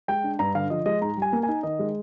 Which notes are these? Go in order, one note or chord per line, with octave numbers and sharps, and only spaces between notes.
G#3 G5
D4
G2 A#5
D3 F5
F3 D#5
G#3 D#5
G#2 A#5
G3
G#5
A#3
G#5
D#4
D#3 D#5
G#3